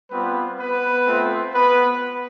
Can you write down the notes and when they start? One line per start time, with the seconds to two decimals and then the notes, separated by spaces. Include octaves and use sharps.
0.11 G3 B3 C4 F4 B4
0.59 B3 B4
1.07 A3 C4 F4
1.55 B3 B4